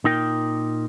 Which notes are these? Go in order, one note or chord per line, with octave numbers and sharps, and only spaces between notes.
A#2 D#4 A#4 G5